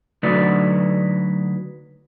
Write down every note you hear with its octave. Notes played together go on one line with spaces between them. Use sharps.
D3 F#3 A3 D#4 B4 D5